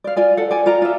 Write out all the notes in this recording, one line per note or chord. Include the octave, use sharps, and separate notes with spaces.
D5 F5
F4 D5 G#5
A4 F#5
D5 G#5
F4 D5 A#5
F4 E5